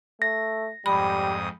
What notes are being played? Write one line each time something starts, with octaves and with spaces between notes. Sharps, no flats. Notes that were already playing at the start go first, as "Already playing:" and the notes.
A3 A#6
F2 G#2 G3 B5 D#6